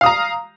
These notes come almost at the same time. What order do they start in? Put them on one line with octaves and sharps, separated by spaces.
F5 D#6 A#5